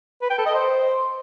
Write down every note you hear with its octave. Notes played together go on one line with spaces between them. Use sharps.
B4
G5
A4
D#5
C5